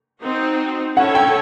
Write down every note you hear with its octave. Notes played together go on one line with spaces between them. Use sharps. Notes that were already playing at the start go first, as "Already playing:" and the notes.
C4 D#4 F#4
C#4 E4 A4 C#5 F#5
G5